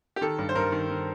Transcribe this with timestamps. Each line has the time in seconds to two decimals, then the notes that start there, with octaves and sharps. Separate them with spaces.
0.16 G4
0.21 D#3 A4
0.38 G2
0.49 C5
0.55 G2 A#4
0.72 D#3
0.90 D#3